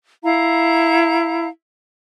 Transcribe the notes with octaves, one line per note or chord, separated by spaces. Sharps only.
E4 F5 A#5